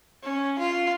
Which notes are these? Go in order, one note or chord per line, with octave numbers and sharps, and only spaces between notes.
C#4
F4